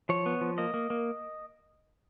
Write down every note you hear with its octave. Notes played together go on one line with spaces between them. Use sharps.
F3 C#5
B3
F3
A#3 D#5
A#3
A#3